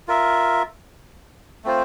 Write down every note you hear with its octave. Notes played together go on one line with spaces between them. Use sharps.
F4 A#4 E5
A3 C4 F4 C5